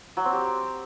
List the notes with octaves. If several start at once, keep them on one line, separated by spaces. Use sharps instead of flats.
F#3
C4
G4